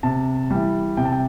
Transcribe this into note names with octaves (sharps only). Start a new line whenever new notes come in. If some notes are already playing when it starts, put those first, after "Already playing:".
C3 A5
E3 G3
C3 G5
A5
G5